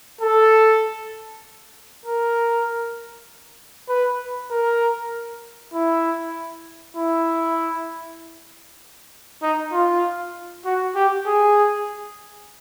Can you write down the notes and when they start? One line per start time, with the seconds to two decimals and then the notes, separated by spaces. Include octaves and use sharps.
0.21 A4
2.05 A#4
3.89 B4
4.51 A#4
5.74 E4
6.97 E4
9.42 D#4
9.73 F4
10.65 F#4
10.95 G4
11.26 G#4